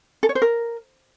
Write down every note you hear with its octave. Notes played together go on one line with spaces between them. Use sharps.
A4
C#5
C5
A#4